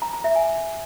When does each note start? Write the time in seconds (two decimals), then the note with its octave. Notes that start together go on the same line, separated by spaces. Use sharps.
0.02 A#5
0.13 A#5
0.24 E5
0.35 G#5